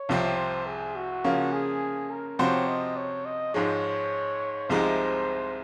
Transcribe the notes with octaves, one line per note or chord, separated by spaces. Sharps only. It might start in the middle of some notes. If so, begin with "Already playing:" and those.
Already playing: C#5
C2 C3 F3 C4
C5
G#4
F#4
C#3 F3 A#3 C#4
G#4
A#4
C3 F3 C4 F#4 C5 C#5
D#5
C#5
D#5
G#2 F3 G#3 C#5
C2 C3 F3 G#3 D#4 C5